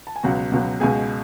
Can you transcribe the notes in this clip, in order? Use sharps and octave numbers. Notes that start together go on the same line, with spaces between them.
A5
G#5
C#2 B2 F#3 F#4 F#5
C#2 B2 F#3
C#2 B2 G#3 G#4 G#5